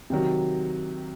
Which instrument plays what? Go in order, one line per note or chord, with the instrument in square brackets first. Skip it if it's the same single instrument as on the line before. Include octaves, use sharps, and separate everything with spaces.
[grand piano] C3 D#3 F#3